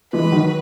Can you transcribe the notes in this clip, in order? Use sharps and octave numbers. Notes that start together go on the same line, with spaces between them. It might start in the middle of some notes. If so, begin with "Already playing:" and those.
E3 G#3 B4
D#3 F#3